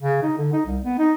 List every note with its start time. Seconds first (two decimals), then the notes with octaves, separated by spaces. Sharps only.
0.02 C#3
0.23 D#4
0.38 D3
0.53 D#4
0.66 C2
0.84 B3
0.99 D#4